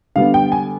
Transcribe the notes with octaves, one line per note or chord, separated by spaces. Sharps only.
D3 G3 B3 D4 F5
G5
G#5